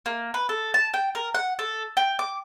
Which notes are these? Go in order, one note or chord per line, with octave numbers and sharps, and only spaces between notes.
A#3
B4
A4
A5
G5
A#4
F#5
A4
G5
D6